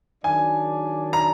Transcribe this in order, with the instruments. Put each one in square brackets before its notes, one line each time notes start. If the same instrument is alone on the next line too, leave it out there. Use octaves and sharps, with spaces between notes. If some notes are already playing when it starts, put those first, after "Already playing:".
[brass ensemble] D#3 F#3 D4 G#4 D5 [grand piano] G#5
[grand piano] A#5